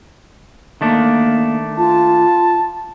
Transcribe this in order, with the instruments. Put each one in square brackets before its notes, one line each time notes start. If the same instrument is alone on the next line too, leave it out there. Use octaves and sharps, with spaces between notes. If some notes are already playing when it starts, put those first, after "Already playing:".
[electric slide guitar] D#3 A3 D4 [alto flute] A#3
[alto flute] F4 [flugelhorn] A5